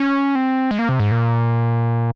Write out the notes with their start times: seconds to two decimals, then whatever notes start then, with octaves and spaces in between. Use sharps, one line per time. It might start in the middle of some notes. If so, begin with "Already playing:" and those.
Already playing: C#4
0.35 C4
0.71 G#3
0.79 A#3
0.89 C3
1.00 G#2
1.11 A#2